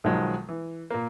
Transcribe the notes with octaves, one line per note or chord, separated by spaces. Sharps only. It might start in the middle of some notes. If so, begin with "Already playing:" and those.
B1 D#3 F3 F#3 G#3
E3
A#2 A#3